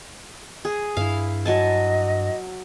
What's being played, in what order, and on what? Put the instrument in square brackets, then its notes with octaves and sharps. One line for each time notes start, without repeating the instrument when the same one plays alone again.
[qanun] G#4
[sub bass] G2 [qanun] E4 F5
[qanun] F#3 G#5 A5 [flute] D#5